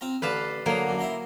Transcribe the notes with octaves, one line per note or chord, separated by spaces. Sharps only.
C4 F4 A#5
A1 D3 B4 F5 A5 D6
D3 F#3 A#3 D#6
F#2 D3
E4 A#5 C6